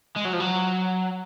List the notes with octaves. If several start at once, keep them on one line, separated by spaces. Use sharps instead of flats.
G#3
F#3
F3
F#3